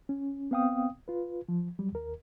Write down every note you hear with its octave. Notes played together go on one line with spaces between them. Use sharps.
C#4
B3 C4 F5 G5 D#6
F4 B4
F3
F#3 G3
D#2 A#4